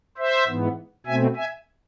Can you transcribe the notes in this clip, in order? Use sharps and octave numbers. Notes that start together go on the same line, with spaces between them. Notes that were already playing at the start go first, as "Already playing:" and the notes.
C5 E5
G#2 E3 B3
B2 A3 C4 E5 G#5
E5 G#5